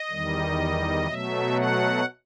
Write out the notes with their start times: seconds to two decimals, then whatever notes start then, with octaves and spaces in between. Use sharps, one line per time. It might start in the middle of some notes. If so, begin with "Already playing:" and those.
Already playing: D#5
0.10 E2 D#3 G3
1.06 B2 F#3 A3 E5
1.55 F#5